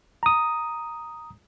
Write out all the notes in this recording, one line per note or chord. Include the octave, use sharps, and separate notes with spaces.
A#5 D#6